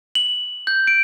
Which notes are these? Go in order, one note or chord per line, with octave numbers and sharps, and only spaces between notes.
F#7
G6
D7